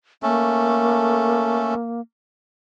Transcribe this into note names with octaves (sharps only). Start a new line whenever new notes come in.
A3 A#3 C#4 A4